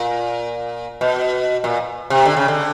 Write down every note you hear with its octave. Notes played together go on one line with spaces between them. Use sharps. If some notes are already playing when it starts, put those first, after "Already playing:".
Already playing: A#2
B2
A#2
C3
D3
C#3
D3